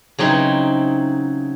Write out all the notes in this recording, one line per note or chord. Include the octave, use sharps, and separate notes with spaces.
C#3 F#3 C4 D#4 E4